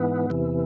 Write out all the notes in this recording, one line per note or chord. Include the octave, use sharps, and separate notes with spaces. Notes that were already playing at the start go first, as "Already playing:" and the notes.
Already playing: G#2 E3 B3
E2 C3 E3